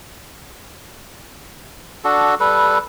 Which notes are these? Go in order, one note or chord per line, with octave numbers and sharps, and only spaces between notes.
D4 F#4 A4
G3 A4 B4